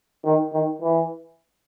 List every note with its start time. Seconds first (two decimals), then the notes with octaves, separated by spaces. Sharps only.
0.25 D#3
0.53 D#3
0.82 E3